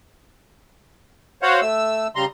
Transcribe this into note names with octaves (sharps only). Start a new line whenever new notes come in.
F#4 C5 C#5 F5 F#5
A3 E6
C#3 G3 A#5 C6